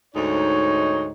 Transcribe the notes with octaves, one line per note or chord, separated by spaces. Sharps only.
D2 G#2 D#4 C#5